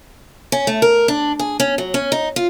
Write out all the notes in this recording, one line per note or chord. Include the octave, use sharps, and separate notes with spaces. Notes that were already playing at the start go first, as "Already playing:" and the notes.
C#4
A3
A#4
D4
G#4
C#4
F#3
C#4
D#4
F4